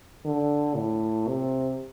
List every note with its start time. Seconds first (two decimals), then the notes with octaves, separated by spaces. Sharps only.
0.25 D3
0.76 A2
1.28 C3